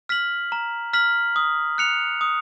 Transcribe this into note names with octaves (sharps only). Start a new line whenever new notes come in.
F6 B6 F#7
A#5
F6 B6 F#7
D#6
F#6 C#7 F7
D#6